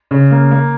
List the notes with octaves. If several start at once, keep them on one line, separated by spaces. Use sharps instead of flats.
C#3
A#3
A#3